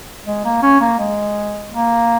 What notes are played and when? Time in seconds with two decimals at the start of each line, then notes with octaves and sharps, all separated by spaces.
0.25 G#3
0.44 A#3
0.62 C#4
0.80 A#3
0.99 G#3
1.72 A#3